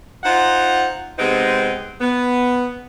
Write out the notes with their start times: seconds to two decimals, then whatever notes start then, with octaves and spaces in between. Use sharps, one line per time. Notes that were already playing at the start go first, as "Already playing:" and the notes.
0.24 D#4 F4 C5 F#5
1.18 C3 G#3 B3 C4 D#4 C5
2.01 B3